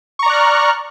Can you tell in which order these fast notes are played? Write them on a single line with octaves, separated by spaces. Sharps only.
C#6 A#5 D5 F#6 F6